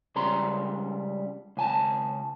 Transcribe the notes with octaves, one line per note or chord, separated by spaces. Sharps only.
C#2 C#3 G3 A#5 C6
C#2 G#5 A5